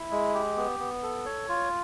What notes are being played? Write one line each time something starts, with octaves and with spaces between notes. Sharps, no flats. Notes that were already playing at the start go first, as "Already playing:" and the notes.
Already playing: E4
G#3
G4
B3
B3
A4
C#5
F4